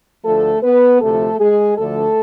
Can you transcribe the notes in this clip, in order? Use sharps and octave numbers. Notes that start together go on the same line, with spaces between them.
D2 D3 F3 A3 A4
B3 B4
D2 C3 F3 A3 A4
G#3 G#4
D2 D3 F3 A3 A4